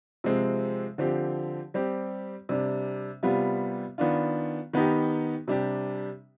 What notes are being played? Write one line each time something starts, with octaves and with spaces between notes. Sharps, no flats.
C3 F3 G#3 C4
D3 F3 C4 G4
G3 C4 G4
C3 G3 D4
C3 G3 B3 F4
D#3 B3 D4 F4
D#3 B3 D#4 G4
C3 G3 D4 G4